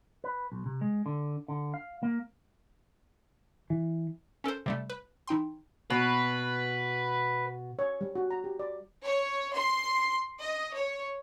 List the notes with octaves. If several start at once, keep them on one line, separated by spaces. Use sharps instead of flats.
B4
B1
C3
G#3
D3
D3
F5
A#3
E3
C#4 A4 A#4 C5
C3 G3 A3
B4
E3 D#4 G5 C6
B2 B4
C#5
G3
F#4
A#5
G4
D5
C#5
C6
D#5
C#5